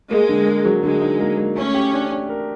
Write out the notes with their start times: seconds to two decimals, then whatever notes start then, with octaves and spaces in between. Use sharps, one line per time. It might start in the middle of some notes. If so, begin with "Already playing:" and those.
0.11 G#3 A#3
0.29 D3
0.46 A#3
0.65 F#3
0.83 D3 G#3
1.01 D#4
1.21 A#3
1.38 A#3
1.56 A3 C#4
1.74 G4
1.93 D4
2.11 D4
2.29 A#4